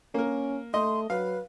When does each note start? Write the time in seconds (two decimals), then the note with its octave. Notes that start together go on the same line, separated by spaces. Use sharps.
0.14 A#3 C#4 A#4
0.74 A3 D#5 C6
1.10 F#3 B4 F5